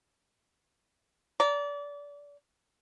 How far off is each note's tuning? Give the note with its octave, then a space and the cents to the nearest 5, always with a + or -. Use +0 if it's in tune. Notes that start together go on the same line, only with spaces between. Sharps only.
D5 -30 A#5 +0